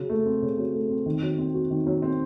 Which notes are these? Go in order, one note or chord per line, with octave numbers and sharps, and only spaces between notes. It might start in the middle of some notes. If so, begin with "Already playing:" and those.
Already playing: C#3 F#3
A3
C4
C#3
F#3
A3
C4
D#3
F#3
C4
F#4
D#3
F#3
C4